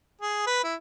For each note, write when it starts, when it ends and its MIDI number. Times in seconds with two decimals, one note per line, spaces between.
0.22 0.44 68
0.47 0.63 71
0.64 0.75 64